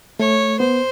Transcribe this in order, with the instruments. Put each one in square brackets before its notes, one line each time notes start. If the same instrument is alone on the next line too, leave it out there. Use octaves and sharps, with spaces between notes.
[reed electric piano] A3 [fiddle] C#5
[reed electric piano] B3 [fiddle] C5